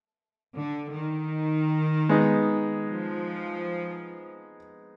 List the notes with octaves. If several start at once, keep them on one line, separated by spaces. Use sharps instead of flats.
D3
D#3
G#3 B3 D#4
F3